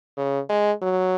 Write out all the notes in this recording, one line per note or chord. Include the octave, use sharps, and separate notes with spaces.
C#3
G#3
F#3